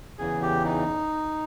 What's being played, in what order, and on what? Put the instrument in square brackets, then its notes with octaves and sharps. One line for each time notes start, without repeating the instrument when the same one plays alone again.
[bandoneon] E2 C#3 E3 G#4
G4
D#4